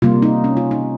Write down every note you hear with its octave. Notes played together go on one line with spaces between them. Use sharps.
C3 G3 A#3 F4
D#4
C#4
F4
D#4